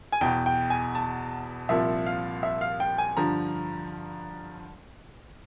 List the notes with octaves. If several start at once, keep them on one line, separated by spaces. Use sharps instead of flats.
G#5
E2 B2 G5
G5
G#5
A5
C2 A#2 F3 E5
F5
E5
F5
G5
G#5
G2 D3 F3 A#5